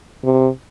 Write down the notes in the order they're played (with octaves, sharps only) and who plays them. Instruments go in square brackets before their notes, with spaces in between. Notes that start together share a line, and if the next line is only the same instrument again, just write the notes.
[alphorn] C3